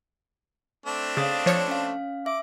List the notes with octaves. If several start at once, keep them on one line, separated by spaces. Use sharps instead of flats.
A3 C4 D4
C#3 F5 D#6 A6
F3 C#5 C#7
C#4 F5
E5 D6